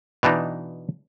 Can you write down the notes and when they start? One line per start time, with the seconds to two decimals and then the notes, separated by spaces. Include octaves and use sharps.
0.23 B2 E3 D4 D#4